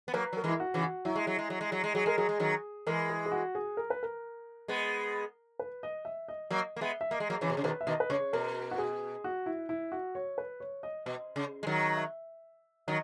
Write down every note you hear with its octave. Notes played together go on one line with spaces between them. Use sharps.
B3
F#3 A#3 B4
F#3 A#4
E3 G#3
E4
F#4
C#3 E3
F#4
F#3 E4
G#3
F#3
G#3
F#3
G#3
F#3
G#3
F#3 G#4
G#3 A#4
F#3 G#4
G#3
D#3 F#3
E3 G#3 A#4
G#4
G#4
F#4
G#4
A#4
B4
A#4
G#3 B3
B4
D#5
E5
D#5
F#3 A#3 D#5
A#3
G#3 B3 E5
E5
A#3 D#5
G#3
F#3 A#3
C#3 E3 C#5
B2
C#3
B2 D#3 B4
E5
B2 D#3 D#5
B4
C#3 C#5
B2 A#4
F#4
G#4
F#4
E4
E4
F#4
C#5
B4
C#5
D#5
B2 D#5
C#3
G#3
D#3 F#3
E5
D#3 F#3 D#5